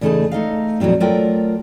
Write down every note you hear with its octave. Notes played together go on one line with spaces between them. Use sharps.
E2 C#3 A3 D#4 G#4 A5
A3 D#4 D#5 F5
F2 A#2 F#3 G3 C4
F#3 A3 F4 A#4 D5 G5